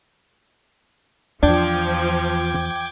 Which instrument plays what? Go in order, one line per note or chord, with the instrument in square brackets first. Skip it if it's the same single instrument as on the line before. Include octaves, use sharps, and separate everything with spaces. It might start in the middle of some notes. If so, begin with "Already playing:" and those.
[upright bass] E2 [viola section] F3 [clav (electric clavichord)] D4 [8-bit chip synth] G5 D6 G#6